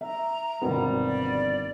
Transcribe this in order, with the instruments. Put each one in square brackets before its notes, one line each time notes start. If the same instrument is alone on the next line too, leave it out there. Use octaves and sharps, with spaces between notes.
[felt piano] E5 [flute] A#5
[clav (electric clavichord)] G1 D#3 B3 [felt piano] G#2 B2 C4 [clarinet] G3
[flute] D5